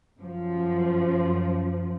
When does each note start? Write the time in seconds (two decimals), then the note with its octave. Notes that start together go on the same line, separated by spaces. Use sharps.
0.19 F#2 F3